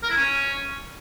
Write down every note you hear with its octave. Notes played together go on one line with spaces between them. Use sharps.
A#4
E4
C#4